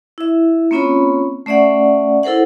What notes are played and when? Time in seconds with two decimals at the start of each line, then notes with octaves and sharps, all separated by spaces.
0.18 E4 E5
0.71 A#3 C4 C#4 F4 C#5 B5
1.46 A3 C#4 D5 E5 F#5
2.23 E4 A4 A#4 C5 F#5